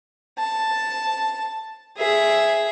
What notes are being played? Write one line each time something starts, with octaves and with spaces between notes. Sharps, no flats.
A5
G#4 E5